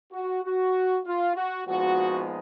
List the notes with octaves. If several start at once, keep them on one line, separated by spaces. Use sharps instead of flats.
F#4
F#4
F4
F#4
A#2 F3 G#3 B3 D#4 F#4